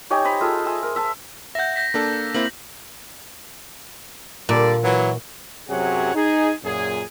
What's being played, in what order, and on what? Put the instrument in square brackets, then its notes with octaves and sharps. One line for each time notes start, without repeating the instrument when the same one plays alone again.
[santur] D#4 G4 C#5 G#5
C5 D#5 A#5 B5
F4 G#4 A4
E5 G#5 C6
A#4
E5 A5
[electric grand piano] E5 F#5 [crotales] G6 A#6
[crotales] G6 A#6 B6
[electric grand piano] A#3 D4 A4
[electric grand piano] A#3 C4 E4 [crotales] F#7
[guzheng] A#2 [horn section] D3 G3 D5
[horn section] E3 F#3
[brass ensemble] F#2 C3 F#3 G#4 C#5 F#5
D#4 G#4
F#2 A#2 G#4